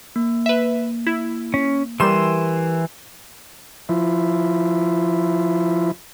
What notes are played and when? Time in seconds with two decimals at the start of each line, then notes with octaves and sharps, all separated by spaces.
0.16 A#3
0.46 B4 E5
1.07 E4
1.54 C#4
2.00 E3 G3 G4 A#4 C6 E7
3.89 F3 E4